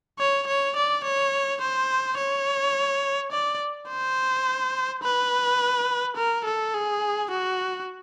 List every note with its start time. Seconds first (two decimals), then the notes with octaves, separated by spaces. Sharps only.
0.19 C#5
0.48 C#5
0.76 D5
1.04 C#5
1.62 C5
2.18 C#5
3.32 D5
3.89 C5
5.03 B4
6.17 A#4
6.45 A4
6.74 G#4
7.31 F#4